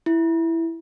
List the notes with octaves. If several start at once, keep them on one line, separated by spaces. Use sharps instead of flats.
E4